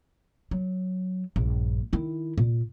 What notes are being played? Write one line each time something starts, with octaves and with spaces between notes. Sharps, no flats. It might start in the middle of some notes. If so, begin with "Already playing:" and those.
F#3
A#1 G2
D#3 E4
A#2